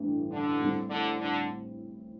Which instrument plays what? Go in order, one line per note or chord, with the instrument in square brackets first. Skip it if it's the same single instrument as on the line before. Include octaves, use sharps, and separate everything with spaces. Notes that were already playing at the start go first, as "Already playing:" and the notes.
Already playing: [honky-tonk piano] A1 G2 D3 A3
[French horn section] D3
[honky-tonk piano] A2 G3 C4 E4
[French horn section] D3
D3